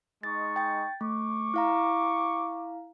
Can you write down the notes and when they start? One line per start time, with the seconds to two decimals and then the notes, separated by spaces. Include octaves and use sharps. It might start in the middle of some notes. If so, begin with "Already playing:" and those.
0.23 G#3 D#4 C#6 A6
0.56 G5 A6
1.01 A3 C#6 D6
1.54 E4 F5 A#5